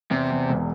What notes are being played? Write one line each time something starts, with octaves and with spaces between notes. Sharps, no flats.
E2 C3
E2
E1